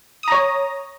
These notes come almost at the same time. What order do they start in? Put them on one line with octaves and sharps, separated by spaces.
D#6 A#5 C#5